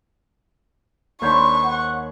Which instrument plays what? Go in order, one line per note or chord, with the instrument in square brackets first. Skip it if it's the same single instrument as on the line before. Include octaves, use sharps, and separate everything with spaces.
[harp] D#2 G6 [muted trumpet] D4 [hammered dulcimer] C5 C#5 B5 [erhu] C#6
[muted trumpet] F#5